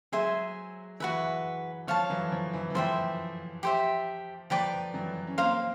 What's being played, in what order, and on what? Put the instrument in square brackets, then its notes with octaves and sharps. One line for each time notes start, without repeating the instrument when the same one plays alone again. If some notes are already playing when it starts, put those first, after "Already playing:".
[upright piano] F#3 G#3 [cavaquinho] G#4 C5 E5 G#5
[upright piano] E3 [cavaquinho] F#4 B4 E5
[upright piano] F3 [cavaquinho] C#5 F5 A5
[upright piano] E3 F#3
F3
E3
E3
[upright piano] F3 [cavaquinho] C5 E5 G5
[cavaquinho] G4 C5 E5
[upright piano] F3 [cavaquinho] B4 D5 G5 A#5
[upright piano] E3 F#3
C#4
[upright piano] A#3 C4 [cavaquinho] C5 F5 A#5